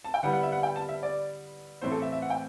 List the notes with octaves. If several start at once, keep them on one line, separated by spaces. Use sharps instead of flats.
A5
G5
D3 G3 B3 E4 F#5
F#5
E5
F#5
G5
A5
E5
D5
A2 E3 A3 C4 E4 C5
A4
E5
E5
F#5
G5